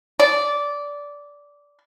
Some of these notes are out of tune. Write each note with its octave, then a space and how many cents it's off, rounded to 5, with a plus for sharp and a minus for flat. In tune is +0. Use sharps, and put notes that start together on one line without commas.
D5 -15